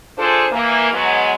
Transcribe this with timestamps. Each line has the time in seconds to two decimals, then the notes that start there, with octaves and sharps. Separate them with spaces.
0.17 D4 F4 G#4 A4 C5
0.52 E3 A#3
0.92 F#3 G#3 B3